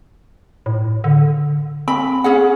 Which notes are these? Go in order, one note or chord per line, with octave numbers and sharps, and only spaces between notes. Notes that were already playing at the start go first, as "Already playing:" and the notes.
A2
D3
C4 B5
C#4 G#4 F#5